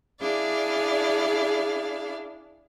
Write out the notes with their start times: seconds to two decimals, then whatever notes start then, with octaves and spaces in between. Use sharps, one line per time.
0.19 D4 E4 G#4 D5 F5